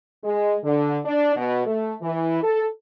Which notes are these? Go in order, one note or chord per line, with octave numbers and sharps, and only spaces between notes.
G#3
D3
D4
B2
A3
E3
A4